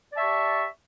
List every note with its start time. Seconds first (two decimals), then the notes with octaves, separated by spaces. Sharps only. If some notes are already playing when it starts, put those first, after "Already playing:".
0.11 D5
0.14 A5
0.17 E5
0.19 C#6
0.22 G4